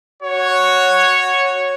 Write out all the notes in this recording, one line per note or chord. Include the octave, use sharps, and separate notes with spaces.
F#4 C#5